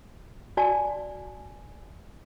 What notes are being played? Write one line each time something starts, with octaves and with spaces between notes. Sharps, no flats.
F#4 D5 G#5 A5